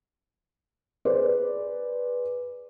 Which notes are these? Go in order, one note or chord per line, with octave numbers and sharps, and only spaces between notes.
G#4 B4 C5 D5